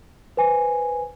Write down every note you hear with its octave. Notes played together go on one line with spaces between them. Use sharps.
B4 C5 G#5